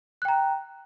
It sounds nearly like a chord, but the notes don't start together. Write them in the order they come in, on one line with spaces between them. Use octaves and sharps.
F#6 G5 A#5